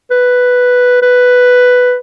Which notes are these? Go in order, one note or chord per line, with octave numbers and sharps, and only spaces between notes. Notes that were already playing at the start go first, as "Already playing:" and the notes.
B4
B4